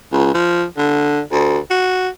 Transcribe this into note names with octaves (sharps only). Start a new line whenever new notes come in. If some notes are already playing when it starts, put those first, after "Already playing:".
C#2
F3
D3
D2
F#4